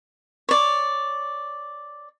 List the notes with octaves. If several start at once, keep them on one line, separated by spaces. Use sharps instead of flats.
C#5 D5